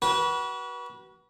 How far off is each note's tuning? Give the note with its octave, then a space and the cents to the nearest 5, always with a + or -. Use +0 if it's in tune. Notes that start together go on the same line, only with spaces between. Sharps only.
F#4 +30 B4 -30